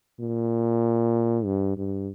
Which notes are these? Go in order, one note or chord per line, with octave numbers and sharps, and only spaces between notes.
A#2
G2
G2